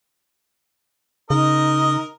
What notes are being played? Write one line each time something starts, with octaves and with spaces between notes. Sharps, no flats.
C#3 D#4 A#4 D#5